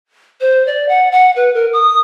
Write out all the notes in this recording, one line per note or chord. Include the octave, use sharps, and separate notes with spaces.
C5
D5
F#5
F#5
B4
A#4
D#6